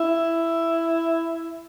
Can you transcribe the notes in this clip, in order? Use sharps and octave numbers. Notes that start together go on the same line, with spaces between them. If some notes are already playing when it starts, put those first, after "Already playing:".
Already playing: E4